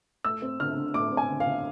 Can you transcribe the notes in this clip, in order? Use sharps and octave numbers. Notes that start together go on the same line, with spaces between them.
A3 E6
C4
D3 F6
D3
A3 D6
C4
G#5
D3
F5
D3